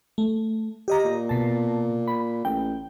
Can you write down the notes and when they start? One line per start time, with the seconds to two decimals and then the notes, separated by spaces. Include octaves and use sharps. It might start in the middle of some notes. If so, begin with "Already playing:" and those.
0.18 A3
0.88 G4 D#5 A#5
1.04 A#2
1.29 B2 A5
2.08 B5
2.45 A1 G5